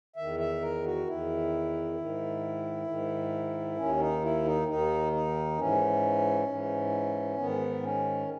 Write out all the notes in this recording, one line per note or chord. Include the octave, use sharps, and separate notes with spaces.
E2 D#3 E5
E5
A#4
F#4
E2 D#3 E4
G#2 D#3
G#2 D#3
D#2 D#3 C#4
D#4
E4
D#4
D#2 D#3 D#4
D#4
G#2 E3 C#4
G#2 E3
G#2 D#3 B3
C#4